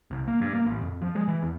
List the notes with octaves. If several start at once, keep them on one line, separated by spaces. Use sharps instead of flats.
C2
A#3
G2
A#3
A1
F2
F3
G#3
E3
E2